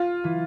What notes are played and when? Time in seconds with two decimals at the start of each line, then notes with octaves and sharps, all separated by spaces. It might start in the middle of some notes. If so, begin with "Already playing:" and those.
Already playing: F4
0.24 E3